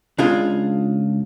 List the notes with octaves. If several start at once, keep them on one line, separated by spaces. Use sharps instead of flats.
C#2 D4 F4 G#4